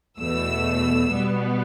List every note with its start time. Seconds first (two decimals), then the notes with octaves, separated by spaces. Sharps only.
0.19 E2 B2 A3 E6
1.10 B2 G3 B3